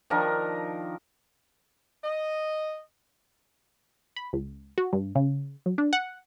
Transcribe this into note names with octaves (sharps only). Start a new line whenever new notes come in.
D#3 F3 D4 A#4
D#5
B5
C#2
F#4
G2
C#3
F#3
D4
F#5